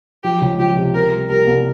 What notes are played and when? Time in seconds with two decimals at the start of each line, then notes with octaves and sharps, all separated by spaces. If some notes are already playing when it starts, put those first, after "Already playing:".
0.23 F3 G4
0.41 C#2
0.59 F3 G4
0.77 C3
0.94 C3 A#4
1.12 G3
1.29 G3 A#4
1.47 C2